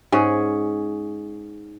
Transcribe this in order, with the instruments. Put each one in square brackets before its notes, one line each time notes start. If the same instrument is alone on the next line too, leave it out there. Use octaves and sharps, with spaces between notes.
[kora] G#2 C#4 G#4